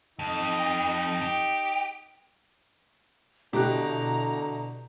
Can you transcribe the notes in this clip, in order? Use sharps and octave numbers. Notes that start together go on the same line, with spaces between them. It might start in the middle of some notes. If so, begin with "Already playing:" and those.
F2 D#4
G4
B2 D3 E4 G4 A#5 F#6